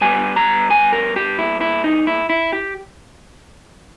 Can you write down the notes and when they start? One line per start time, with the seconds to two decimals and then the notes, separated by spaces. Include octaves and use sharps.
0.01 G2 G3 B3 G#5
0.36 A#5
0.70 G#5
0.93 A#4
1.16 G4
1.39 E4
1.61 E4
1.84 D#4
2.07 E4
2.30 E4
2.52 G4